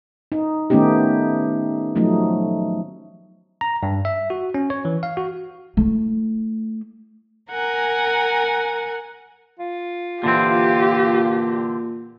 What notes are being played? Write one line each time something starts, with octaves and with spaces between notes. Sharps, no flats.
D#4
D#3 A3 B3 C#4 D#4 G4
F3 F#3 A3 D#4
A#5
G2
E5
F#4
C#4
C#5
E3
F5
F#4
A3 E4
A#4 F#5 G#5 A#5
F4
A#2 D3 E3 C4 G4